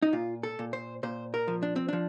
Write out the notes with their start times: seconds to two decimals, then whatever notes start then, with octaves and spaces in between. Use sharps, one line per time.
0.02 D#4
0.13 A#2 F4
0.43 A4
0.59 A#2
0.73 C5
1.03 A#2 C5
1.34 A#4
1.48 F3
1.63 D4
1.76 C4
1.88 F3 D4